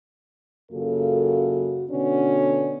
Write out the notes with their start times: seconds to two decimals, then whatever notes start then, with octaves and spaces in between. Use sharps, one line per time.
0.72 F#2 C#3 A#3 F4 F#4 A4
1.90 B2 D3 B3 C#4 D4 F#4